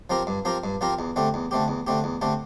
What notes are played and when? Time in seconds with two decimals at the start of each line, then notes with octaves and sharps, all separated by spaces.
0.10 F3 C4 G4 A#4
0.27 G2
0.45 F3 C4 G4 A#4
0.64 G2
0.81 F3 C4 G4 A#4
0.99 E2
1.16 D3 A3 C4 G4
1.34 E2
1.51 D3 A3 C4 G4
1.68 E2
1.87 D3 A3 C4 G4
2.04 E2
2.22 D3 A3 C4 G4